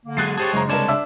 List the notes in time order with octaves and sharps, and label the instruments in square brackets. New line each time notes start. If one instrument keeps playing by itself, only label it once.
[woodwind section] D3 A#3
[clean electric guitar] F#3 G#3 G#4 [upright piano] F#6 A6 C7
[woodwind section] G4 A5 [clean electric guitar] G#4 C5 C#5
[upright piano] F#1 A#5 [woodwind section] C#3 G#3
[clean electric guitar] C2 C#5 A5 [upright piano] D4 A#4
[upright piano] D4 E5 E6